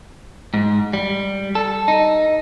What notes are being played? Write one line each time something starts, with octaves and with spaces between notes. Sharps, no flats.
G#2
G3
A4
D#4